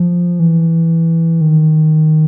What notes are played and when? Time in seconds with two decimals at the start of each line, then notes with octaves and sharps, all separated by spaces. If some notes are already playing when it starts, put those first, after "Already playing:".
Already playing: F3
0.40 E3
1.41 D#3